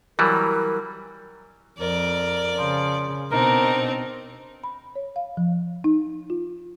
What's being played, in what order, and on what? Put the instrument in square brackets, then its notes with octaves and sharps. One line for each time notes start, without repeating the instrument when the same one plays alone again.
[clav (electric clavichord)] E3 F#3 G3 [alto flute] A#4
[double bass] F2 [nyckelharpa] A#4 [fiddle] D5
[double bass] C#3 [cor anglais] F3
[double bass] B2 [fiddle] C4 D#4 [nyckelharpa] D4 [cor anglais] A#4
[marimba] B5
C#5
F5
F3
D#4
F4